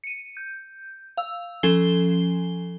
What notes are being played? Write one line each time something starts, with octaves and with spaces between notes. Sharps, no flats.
C#7 D#7
G6
F5 E6
F3 C#4 A4 G#5 C7 G7